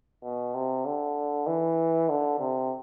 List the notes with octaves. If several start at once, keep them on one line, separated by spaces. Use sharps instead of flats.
B2
C3
D3
E3
D3
C3